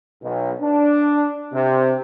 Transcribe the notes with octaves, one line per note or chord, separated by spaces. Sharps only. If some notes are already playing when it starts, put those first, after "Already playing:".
B1
D4
C3